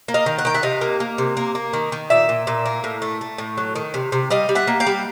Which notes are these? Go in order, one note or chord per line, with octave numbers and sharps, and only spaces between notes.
A#3
D#5 F5
D#3
F#5
D#3 G5
E5 F#5
C3 D#5 F5
A#3
A#3
C3
A#3
A#3
D#3
D#3
A#2 D5 E5
A#2
A#2
A#3
A2
A3
A3
A2
F#3
D#3
C3
C3
G3 D#5 F5
G3
E5 F#5
A#3
F5 G5
G3